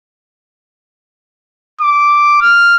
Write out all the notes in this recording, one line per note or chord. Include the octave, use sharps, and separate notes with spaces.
D6
F6